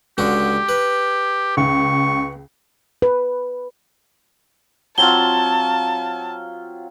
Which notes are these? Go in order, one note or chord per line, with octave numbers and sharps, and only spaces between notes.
C#2 D3 F#4 G4
B4
C#2 C#6
B4
F#3 C4 F4 A5 G7